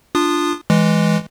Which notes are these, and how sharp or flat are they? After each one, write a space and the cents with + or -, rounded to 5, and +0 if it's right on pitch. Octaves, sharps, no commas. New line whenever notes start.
D4 +5 F4 +0 D#6 -25
E3 +0 G#3 +0